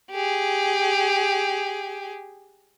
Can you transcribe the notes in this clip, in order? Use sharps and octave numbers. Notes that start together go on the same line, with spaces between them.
G4 G#4